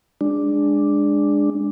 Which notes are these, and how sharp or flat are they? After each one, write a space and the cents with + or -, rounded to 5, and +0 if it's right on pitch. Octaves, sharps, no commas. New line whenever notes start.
G#3 -15 D4 +0